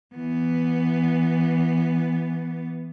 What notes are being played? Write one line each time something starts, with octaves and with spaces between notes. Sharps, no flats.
E3 B3